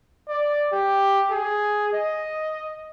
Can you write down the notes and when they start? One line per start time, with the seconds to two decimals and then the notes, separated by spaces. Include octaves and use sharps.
0.29 D5
0.72 G4
1.31 G#4
1.93 D#5